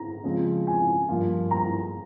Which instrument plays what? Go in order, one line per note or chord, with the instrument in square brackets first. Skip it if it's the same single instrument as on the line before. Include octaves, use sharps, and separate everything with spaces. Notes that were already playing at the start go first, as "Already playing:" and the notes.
Already playing: [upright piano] A#5
[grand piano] C#3 F3 G#3 C4
[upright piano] G#5
[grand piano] G2 F3 A#3 F4
[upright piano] A#5